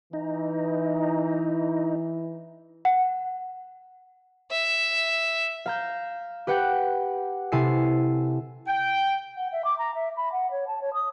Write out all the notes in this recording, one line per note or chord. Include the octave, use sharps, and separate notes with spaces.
E3 D#4
F#5
E5
F5 A#5 G6
G4 B4 F#5 G5
C3 E4 A4 G#5 C7
G5
F#5
E5
D6
A#5
E5
B5
F#5
C#5
A5
C#5
D#6